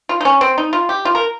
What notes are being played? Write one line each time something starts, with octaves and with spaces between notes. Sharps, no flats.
F4
D#4
C#4
C4
D#4
F4
G4
F4
A#4